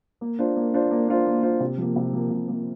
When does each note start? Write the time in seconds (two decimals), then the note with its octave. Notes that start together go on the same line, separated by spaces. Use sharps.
0.21 A#3
0.39 D4 F4 C5
0.56 A#3
0.74 D4 F4 C5
0.91 A#3
1.08 D4 F4 C5
1.26 A#3
1.43 D4 F4 C5
1.60 C3
1.78 F3 A#3
1.96 C3
2.13 F3 A#3
2.31 C3
2.48 F3 A#3